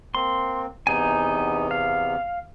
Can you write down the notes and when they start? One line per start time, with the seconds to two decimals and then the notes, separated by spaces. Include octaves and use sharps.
0.15 A#3 C4 C6
0.87 E2 C3 B3 D#4 G#5
1.71 F5